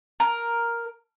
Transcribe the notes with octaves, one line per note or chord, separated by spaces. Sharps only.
A#4